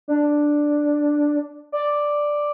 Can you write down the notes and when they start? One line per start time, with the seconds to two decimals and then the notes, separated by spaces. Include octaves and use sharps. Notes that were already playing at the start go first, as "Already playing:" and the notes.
0.08 D4
1.72 D5